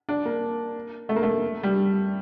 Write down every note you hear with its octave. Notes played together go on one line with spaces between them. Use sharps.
D4
A#3
A3
A#3
A3
G3